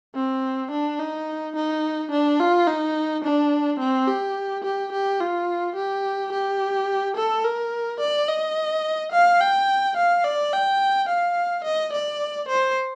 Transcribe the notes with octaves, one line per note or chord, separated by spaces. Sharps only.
C4
D4
D#4
D#4
D4
F4
D#4
D4
C4
G4
G4
G4
F4
G4
G4
A4
A#4
D5
D#5
F5
G5
F5
D5
G5
F5
D#5
D5
C5